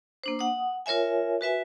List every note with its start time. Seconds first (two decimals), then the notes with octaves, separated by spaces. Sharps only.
0.24 A#3 D4 C5
0.39 F#5 D#6
0.86 F4 A#4 C#5 E5 G#5
1.41 F#4 B4 E5 G#5